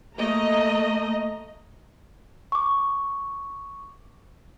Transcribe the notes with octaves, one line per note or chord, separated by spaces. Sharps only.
A3 A#3 D#5 A#5
C#6 D6